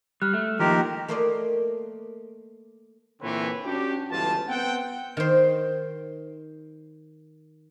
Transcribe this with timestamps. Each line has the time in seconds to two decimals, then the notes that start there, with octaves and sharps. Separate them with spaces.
0.22 G3 F6 F#6
0.33 A3
0.60 D#3 F3 A#3 G4 A#4
1.08 A3 A#3 A#4 C5 D5 D#5
3.22 A#2 D3 E3 C4 B4 C#5
3.66 C#4 D4 F#4 G4
4.11 G1 C#2 E3 F4 A5
4.49 B3 C4 F#5 G5
5.17 D#3 C5